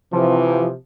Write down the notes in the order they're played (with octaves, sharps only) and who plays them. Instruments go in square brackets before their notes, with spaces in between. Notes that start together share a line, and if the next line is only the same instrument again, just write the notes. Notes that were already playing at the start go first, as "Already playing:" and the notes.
[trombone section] C3 [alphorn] E3 [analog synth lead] F3